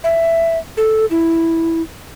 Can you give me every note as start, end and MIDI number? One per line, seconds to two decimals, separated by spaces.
0.04 0.58 76
0.77 1.06 69
1.10 1.82 64